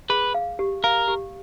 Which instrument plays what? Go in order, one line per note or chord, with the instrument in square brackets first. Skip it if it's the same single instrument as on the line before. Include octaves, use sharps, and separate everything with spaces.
[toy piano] G#4 [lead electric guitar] B4
[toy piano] F5
G4
[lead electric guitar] A#4 [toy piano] F5
[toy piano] G4